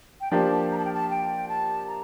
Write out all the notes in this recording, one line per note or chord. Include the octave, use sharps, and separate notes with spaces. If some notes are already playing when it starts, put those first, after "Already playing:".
G5
F3 A#3 D4 G4 A#4 A5
A#5
A5
G5
A5
G5
A5
A#5